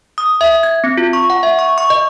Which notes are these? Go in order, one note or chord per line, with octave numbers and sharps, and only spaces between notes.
D#6
E5
G#6
C4
F4
C#6
F#5
E5
C#6
C#6
D#5